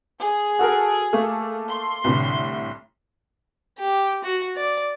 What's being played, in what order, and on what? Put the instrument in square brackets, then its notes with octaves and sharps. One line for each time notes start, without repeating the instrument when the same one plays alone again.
[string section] G#4
[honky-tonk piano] F#4 A4 A#4
A3 A#3 A4
[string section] C6
[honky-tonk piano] C2 A2 D3
[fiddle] G4
F#4
D5